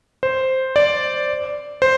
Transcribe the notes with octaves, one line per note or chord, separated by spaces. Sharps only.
C5
D5
C5